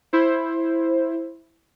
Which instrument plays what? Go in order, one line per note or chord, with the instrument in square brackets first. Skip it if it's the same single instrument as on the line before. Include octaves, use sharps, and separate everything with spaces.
[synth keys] E4 C5